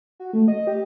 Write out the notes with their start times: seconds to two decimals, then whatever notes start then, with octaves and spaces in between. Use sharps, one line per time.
0.20 F#4
0.33 A3
0.48 D#5
0.67 G4